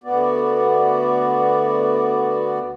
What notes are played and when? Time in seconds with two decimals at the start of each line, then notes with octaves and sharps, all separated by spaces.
0.04 D2 B3 F#4 D5